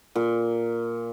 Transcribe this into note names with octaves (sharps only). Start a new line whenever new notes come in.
A#2